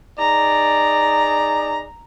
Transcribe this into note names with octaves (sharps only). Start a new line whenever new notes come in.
D#4 G#4 D5 A#5